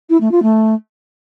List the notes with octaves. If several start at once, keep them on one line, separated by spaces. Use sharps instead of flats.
E4
A3
F4
A3